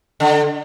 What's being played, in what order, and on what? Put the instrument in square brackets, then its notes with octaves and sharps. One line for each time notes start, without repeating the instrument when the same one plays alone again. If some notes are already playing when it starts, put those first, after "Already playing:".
[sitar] D3